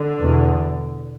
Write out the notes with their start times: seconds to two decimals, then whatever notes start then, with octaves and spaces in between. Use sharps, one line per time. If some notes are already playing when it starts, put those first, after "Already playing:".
Already playing: D3
0.20 E2 B2